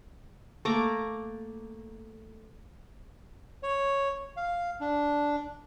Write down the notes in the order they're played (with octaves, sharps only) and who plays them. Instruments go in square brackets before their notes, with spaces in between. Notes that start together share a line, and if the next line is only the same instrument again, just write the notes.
[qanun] A3 A#3 A#5 D6
[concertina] C#5
F5
D4